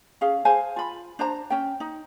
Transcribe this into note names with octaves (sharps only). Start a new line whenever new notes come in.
C#4 G#4 F5
G#4 C5 F5 G#5
F4 B5
D4 C5 A#5
C#4 G5
D#4